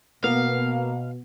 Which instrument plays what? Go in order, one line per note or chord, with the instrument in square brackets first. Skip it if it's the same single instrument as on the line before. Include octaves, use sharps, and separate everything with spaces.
[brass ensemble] B2 [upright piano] A#3 [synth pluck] B3 [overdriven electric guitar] F5